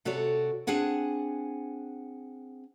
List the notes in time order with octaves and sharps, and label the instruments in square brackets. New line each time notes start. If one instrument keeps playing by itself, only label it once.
[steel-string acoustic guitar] C3 F#4 A4 C#5 D5
C4 D4 G#4 F#5 G#5